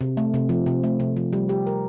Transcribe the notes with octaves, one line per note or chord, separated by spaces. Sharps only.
C3
A3
C3
F3
C3
A3
C3
F3
G3
G4
A#4